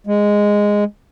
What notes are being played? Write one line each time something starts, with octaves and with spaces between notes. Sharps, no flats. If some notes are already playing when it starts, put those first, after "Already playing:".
G#3